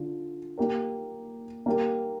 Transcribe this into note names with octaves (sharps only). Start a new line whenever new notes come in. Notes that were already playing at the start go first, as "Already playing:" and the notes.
Already playing: D3 F4
A#3 G4 A#4
A#3 G4 A#4